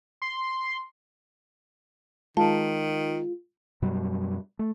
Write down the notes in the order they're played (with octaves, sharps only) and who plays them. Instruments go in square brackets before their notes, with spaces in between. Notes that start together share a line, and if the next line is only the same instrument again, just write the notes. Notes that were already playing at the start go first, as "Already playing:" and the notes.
[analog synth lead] C6
[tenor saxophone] D#3 [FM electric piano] G#3 F4 [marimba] A5
[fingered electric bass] F#2 B2 F#3 G3
A3